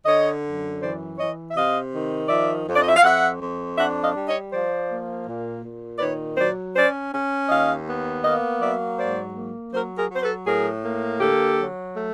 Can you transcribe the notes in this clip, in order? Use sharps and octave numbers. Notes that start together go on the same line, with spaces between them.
D3 C#5 D#5
F#2
E3 C5 D5
E3 C#5 D#5
E5
C3 D#5 F5
D#3
F3 D5 E5
F2
D5
D#5
E5
F5
F2 E5 F#5
F2
D4 E5 F#5
D#5 F5
G3
C#5 D#5
F3 C5 D5
A#3
A#2
A#2
D5
D#3 B4 C#5
F#3 C5 D5
C#4 C5 D5
C#4
D#2 D#5 F5
B3
A#3 D#5 F5
F#3 D5 E5
G#2 C5 D5
A#3
F#3 A#4 C5
G#4 A#4
F#3
C5
A4 B4
A2 G#4 A#4
A#3
D3 G4 A4
F#3
A3